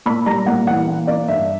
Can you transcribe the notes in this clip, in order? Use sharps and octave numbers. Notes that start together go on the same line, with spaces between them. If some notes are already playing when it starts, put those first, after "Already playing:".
A#2 B5
G3 A#5
A#2 F#5
E3 F#5
A#3
A#3 D5
G2 E5